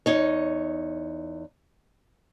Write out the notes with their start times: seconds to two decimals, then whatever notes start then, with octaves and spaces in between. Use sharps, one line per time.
0.06 E2 D#4 C#5